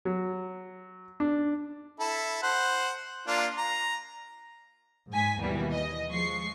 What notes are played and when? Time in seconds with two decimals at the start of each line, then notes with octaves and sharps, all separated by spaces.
0.05 F#3
1.20 D4
2.00 E4 A4
2.43 C5 F#5
3.27 A#3 D4 F4
3.58 A#5
5.10 G#2 G#3 G#5 B6
5.39 D#2 B2 E3 G3 B3
5.73 D#5
6.09 F3 G#3 C#6 C7